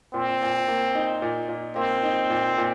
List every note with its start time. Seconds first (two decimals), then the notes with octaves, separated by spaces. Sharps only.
0.14 A#2 C4
0.42 A#2
0.68 A#3
0.95 D#4
1.22 A#2
1.49 A#2
1.76 A#3 C4
2.03 D#4
2.30 A#2
2.58 A#2